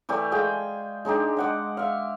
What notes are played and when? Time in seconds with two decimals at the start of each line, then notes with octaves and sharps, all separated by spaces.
0.09 E3 A3 G4 D5
0.32 G#3 G#4 F5 G5
1.05 G#3 D4 D#4 G4
1.37 D#5 F#5 D6
1.77 E5 F5